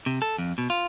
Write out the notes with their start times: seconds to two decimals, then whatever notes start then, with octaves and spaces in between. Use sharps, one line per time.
0.06 C3
0.22 A4
0.38 F2
0.58 B2
0.70 F4